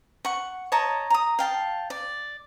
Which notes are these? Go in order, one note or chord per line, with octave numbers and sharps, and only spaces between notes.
F#5 C#6
C#5 D#5 A5 A#5
A#5 D#6
F5 G5 A5
D5